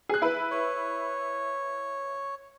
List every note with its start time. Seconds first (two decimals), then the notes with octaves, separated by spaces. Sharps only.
0.09 G#4 F#6
0.22 E4 B4
0.51 C#5